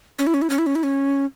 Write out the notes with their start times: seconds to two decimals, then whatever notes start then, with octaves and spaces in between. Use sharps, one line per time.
0.19 C#4
0.27 E4
0.34 C#4
0.42 E4
0.50 C#4
0.59 E4
0.67 C#4
0.75 E4
0.83 C#4